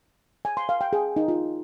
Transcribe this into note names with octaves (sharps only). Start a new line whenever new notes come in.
G#5
C6
F5
G5
G#4
D#4
F4